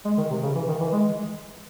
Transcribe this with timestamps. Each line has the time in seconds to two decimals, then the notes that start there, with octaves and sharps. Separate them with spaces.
0.05 G#3
0.18 D#3
0.31 C3
0.43 C#3
0.55 E3
0.68 D#3
0.80 E3
0.93 G#3